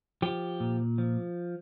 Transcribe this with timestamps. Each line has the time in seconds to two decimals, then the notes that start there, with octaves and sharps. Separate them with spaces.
0.22 F3 G4
0.60 A#2
0.98 F3